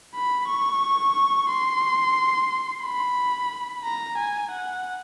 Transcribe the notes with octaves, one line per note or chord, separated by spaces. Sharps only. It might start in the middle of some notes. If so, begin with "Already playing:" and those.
B5
C#6
C6
B5
A#5
G#5
F#5